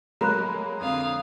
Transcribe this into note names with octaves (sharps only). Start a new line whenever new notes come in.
F#3 G#3 A#3 A#5 B5 F#6
F2 D3 F5 D#6